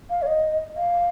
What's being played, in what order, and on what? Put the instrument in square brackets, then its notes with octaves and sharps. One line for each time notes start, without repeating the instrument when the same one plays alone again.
[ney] F5
C#5
D#5
F5